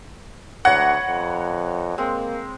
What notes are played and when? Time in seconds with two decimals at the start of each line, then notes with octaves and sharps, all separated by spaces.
0.65 D2 B4 C#5 F#5 A#5
1.07 F2
1.98 G#3 A#3 C4